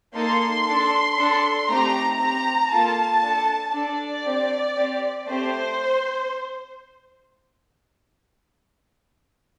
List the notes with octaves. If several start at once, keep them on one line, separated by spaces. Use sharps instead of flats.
A#3 D#4 A4 C6
D4 A4
D4 A4
A3 C4 D#4 G4 A#5
C4 G4 A#5
A#3 F4 A4 A5
D4 A4
D4 A4 D5
C4 G4
C4 G4
A3 C4 G4 C5